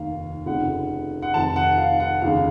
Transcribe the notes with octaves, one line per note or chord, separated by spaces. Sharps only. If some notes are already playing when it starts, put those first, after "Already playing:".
Already playing: F1 D#2 D#3 F5
F1 F2 C#3 F#5
F#5
F1 F2 D#3 A5
F#5
F5
F#5
F1 D#2 C#3 F5